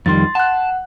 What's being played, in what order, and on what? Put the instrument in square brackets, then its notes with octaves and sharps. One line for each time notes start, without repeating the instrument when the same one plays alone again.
[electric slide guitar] F2 D#3 G3 [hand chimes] C6 A6
[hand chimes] F#5 F#6 [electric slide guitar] A5